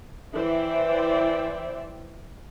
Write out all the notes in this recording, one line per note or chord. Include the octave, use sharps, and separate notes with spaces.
E3 C5 D5 E5 G5